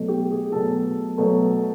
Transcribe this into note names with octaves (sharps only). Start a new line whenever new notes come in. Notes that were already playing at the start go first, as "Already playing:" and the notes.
Already playing: B2 F#3 A3
G4
G#4
B2 F#3 A3 A4
B2 F#3 A3